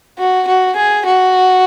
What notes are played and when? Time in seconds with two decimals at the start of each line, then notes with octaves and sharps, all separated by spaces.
0.18 F#4
0.47 F#4
0.76 G#4
1.06 F#4